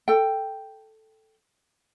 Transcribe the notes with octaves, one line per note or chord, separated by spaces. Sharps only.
A4 G5